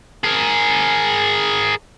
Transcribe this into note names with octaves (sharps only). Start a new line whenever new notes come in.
G#4 A#4